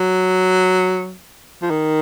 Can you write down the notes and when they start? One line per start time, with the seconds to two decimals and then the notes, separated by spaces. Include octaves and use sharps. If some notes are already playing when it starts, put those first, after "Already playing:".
Already playing: F#3
1.62 F3
1.70 D#3